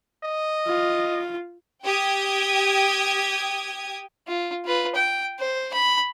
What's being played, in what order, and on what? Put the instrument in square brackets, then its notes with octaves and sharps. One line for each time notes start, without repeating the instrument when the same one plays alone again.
[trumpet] D#5
[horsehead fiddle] F4
[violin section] G4 G5 D#6 G#6
[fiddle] F4
F4 B4
G5
C5
B5